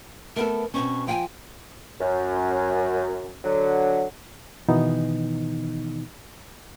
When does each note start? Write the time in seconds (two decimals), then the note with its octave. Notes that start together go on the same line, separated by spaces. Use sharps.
0.36 A3 B3 A4 A#4
0.74 B2 C4 C#4 C#6
1.07 F3 F5 G5 G#5
2.00 F#2
3.44 D3 F#3
4.69 B2 D#3 E3 B3 D#4